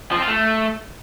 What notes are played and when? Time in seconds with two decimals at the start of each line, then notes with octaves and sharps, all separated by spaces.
0.11 F3
0.17 C4
0.22 F4
0.27 A3